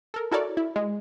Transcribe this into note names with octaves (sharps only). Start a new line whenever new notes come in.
A4 A#4
E4 F#4 A4 A#4 C#5 D5
E4
G#3